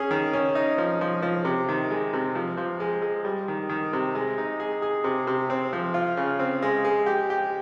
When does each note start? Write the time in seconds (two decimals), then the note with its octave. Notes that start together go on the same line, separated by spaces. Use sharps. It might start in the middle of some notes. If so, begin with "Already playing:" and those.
Already playing: C#4 G#4
0.11 D#3
0.33 C#4
0.55 D#4
0.78 F3
1.01 F3
1.22 F3
1.45 C3
1.68 D#3
1.90 G#3
2.13 C3
2.35 F3
2.57 F3
2.80 G#3
3.02 G#3
3.25 G3
3.48 D#3
3.69 D#3
3.93 C3
4.15 G#3
4.38 D#4
4.60 G#4
4.82 G#4
5.04 C3
5.27 C3
5.50 C4
5.73 F3
5.94 F4
6.17 C#3
6.39 C4
6.62 G#3
6.85 G#3
7.06 G4
7.30 G4